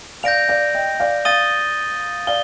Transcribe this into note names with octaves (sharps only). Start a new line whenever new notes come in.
D5 F5 G6 A#6 D7 F7
D5 F5
D#5 G5
D5 F5
D5 F5 D#6 A6 D#7 G7
D5 F5 G7